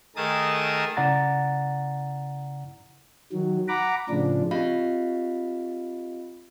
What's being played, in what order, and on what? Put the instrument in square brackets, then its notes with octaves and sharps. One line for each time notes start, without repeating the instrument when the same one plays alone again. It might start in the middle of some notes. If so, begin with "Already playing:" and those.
[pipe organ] D#3 A3 G#4 A#4 A5 D#6
[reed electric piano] C#3 E4 D5 F#5 A#5 A6
[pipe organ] D#3 F#3
F#5 A#5 B5 D6
A2 C#3 F3 D4
[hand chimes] C4 F4 G4 D#5 F5 B5